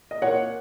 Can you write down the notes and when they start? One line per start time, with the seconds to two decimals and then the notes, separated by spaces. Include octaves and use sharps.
0.11 D#5
0.22 A#2 C#5 F#5